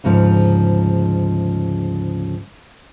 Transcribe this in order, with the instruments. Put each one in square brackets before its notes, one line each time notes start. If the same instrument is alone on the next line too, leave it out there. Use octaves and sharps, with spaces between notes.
[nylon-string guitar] D2 G#2 C#3 F3